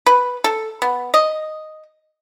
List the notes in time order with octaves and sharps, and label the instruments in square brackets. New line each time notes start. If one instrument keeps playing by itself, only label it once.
[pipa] B4
A4
B3
D#5